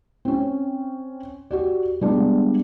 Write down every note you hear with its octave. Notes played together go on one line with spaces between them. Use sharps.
C4 C#4
F#4 G4 D5
G3 G#3 B3 D4